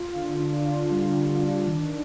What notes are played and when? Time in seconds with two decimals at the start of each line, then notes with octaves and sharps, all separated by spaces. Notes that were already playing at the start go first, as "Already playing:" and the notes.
Already playing: F4
0.15 D3
0.40 D4
0.65 F4
0.91 G3
1.17 D3
1.42 D4
1.68 D#3